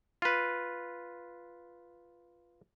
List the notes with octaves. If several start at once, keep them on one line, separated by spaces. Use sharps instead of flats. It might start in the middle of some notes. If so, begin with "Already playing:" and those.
F4 B4